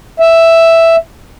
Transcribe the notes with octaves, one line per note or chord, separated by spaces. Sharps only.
E5